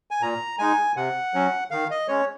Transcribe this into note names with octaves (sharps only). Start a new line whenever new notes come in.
G#5
A#2 A#5
G#3 D#4 G#5
C3 F#5
F#3 C#4
D#3 F5
D#5
G#3 C#4 C#5